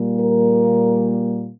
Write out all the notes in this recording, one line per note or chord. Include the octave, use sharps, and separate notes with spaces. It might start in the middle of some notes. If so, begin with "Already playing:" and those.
Already playing: A#2 G3 A#3
A#4